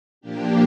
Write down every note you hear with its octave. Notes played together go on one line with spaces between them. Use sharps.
A#2 F3 A#3 D4 G4